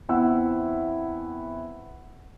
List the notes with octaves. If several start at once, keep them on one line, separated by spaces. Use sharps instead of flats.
E2 C4 E4 F#5 E6